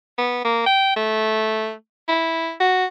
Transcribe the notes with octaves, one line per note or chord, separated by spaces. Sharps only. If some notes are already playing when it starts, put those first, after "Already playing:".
B3
A#3
G5
A3
E4
F#4